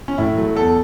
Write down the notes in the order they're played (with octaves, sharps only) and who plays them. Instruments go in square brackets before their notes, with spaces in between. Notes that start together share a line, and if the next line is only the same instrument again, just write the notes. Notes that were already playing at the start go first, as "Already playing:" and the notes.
[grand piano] C#4
A2 E4
F#3 A3
E2 A4